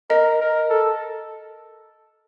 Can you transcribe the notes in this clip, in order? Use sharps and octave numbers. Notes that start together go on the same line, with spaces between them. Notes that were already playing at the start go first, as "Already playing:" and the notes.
A#4 D#5
A#4
A4